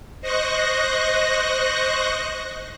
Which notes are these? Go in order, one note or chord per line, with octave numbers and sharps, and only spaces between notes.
C5 D#5 C#6 F#6 A#6